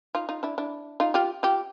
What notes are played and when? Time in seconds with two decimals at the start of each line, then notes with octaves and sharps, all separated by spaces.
0.15 D#4 F4
0.29 D#4 F4
0.43 D4 E4
0.58 D4 E4
1.00 D#4 F4
1.14 F4 G4
1.43 F4 G4